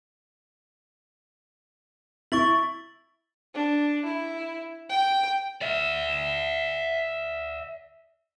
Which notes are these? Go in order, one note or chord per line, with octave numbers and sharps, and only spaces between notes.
E4 C#6 A6 F#7
D4
E4
G5
D5 E5